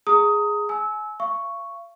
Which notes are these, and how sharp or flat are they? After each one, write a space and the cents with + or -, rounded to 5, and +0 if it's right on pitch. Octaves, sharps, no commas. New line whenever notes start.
G#4 +0 A#5 -25 D#6 +15
G#5 +35 E6 -20
F5 -40 C#6 +0